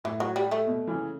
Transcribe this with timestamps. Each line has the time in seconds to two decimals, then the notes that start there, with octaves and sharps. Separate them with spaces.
0.04 A2 E3
0.20 F#3
0.36 G3
0.51 A3
0.67 B2
0.87 C#3 E3